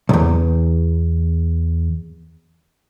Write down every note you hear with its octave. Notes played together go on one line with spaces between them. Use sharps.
B1 E2